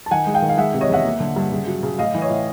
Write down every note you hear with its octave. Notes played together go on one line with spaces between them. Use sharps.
A5
D#3 F#5 G#5
G#3
F5 G5
D#3
F5
G#3 E5 F#5
C3
C#5 D#5
E2 E5 F#5
A#3
D3
G2
C#3
F#3
C#3
A2 D#5 F5
E3
C#5 D#5
A2